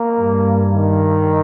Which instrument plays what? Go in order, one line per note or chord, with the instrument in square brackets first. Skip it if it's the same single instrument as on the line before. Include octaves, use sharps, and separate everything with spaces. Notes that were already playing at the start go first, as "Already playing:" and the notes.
Already playing: [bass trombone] A#3
[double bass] G2
[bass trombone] D#3